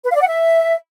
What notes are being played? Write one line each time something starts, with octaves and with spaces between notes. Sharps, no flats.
B4
F5
D5
F#5
E5